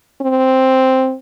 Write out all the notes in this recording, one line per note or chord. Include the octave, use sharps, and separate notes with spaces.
C4